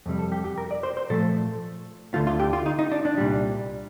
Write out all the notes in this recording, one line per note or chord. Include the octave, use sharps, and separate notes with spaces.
F2 C3 G3
A4
G4
G4
A#4
D5
C5
C5
A#2 F3 A3 A4
D2 D3 A3 F4
F4
G4
F4
D#4
D#4
D4
D4
C2 A#2 G3